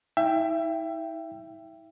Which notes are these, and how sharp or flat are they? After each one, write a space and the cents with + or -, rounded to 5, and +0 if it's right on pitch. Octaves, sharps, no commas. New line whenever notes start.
E4 -45 E5 +25 G5 +0